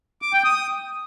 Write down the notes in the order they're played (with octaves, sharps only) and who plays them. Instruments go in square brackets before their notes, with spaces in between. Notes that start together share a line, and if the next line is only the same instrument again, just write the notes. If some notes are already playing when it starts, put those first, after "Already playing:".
[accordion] D6
G5
D#6